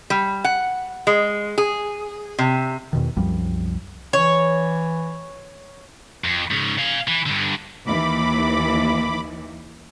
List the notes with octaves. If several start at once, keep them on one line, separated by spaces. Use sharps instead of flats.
G3
F#5
G#3
G#4
C3
E2 B2 D#3
C2 F#2 F3 G3
E3 C#5
F2
G#2 C#3
F5 G#5
E3
G2 D3
D#2 E3 B5 D6